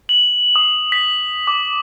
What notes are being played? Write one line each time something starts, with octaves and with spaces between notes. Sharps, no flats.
F#7
D#6
B6
D6